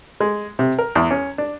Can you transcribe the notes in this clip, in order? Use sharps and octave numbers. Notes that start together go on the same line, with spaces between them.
G#3
C3
A#4
E2
C#4
D4